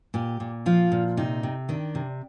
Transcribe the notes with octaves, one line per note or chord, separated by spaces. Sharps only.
A#2 G4
A#2
F3 F4
A#2
C3 D#4
C3
D#3 D4
C3